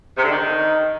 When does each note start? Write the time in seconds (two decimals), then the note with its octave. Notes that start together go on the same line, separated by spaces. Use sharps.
0.18 C3
0.24 D3
0.31 D#3